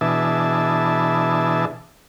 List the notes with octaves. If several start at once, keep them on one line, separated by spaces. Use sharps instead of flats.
B2 E3 D4 G#4 E5 A5